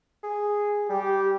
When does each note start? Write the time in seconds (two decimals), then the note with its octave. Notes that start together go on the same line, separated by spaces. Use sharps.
0.23 G#4
0.89 G3 G4